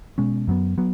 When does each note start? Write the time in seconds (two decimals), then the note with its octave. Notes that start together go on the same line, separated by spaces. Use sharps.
0.18 B2 G#3 C#4
0.48 F#2 F#3 B3
0.78 F#3 B3